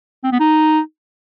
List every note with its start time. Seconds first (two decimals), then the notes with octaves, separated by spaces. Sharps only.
0.24 C4
0.32 B3
0.40 D#4